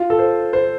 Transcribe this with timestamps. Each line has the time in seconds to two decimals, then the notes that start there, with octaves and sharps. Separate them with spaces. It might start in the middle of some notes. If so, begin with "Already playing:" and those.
Already playing: F4
0.10 A4
0.19 C5
0.53 C5